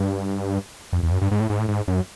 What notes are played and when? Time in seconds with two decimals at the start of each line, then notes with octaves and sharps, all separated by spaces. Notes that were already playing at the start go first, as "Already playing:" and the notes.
Already playing: G2
0.93 F2
1.03 E2
1.11 F#2
1.22 G2
1.31 G#2
1.40 A2
1.50 G#2
1.59 A2
1.68 G#2
1.87 F#2